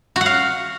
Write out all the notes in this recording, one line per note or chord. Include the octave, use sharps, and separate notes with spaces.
F#4
F#5
F5